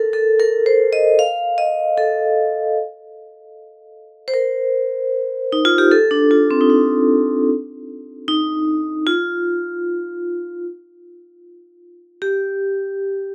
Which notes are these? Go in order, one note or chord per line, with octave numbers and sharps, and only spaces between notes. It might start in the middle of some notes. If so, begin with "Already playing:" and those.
Already playing: A4 A#4
A4
A#4
C5
D#5
F5
D#5
A4
C5
A#4
D#4
F4
G4
A4
D4
F4
C4
D#4
D4
D#4
F4
G4